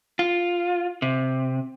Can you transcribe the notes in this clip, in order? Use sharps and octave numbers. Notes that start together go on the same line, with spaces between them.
F4
C3